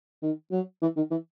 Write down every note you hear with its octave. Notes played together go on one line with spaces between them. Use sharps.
D#3
F#3
E3
D#3
E3